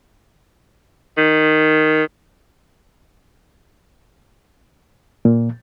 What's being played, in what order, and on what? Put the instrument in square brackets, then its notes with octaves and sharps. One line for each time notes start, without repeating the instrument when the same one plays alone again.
[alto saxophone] D#3
[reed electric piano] A#2